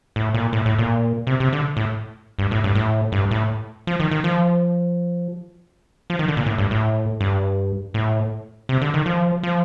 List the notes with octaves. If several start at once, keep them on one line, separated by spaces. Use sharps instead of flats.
A2
A#2
A2
A2
A#2
C3
C3
D3
A2
G2
A2
G2
A2
G2
A2
F3
D#3
D#3
F3
F3
D#3
D3
A#2
A2
G2
A2
G2
A2
C3
D3
D#3
F3
F3